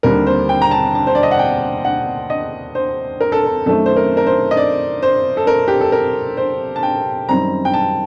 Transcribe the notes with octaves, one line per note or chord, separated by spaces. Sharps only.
D#2 D3 G3 C4 A#4
C5
G5
A#5
A5
A5
C5
D5
D#5
F#5
G5
F#5
D#5
C5
A#4
A4
A#4
F#2 D#3 A3 C4 A4
C5
A#4
A#4
C5
D#5
D5
C5
A4
A#4
G4
A4
A#4
C5
A5
G5
F#2 D#3 G3 C4 A#5
G5
A5